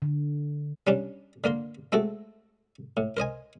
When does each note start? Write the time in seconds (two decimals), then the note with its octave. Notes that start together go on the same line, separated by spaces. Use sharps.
0.02 D3
0.87 G3 C#4 D4
1.44 D3 A#3 A#4 C6
1.92 G#3 A3 C4 F#4 A4
2.97 A2
3.17 A#4 C5 D#5 G#5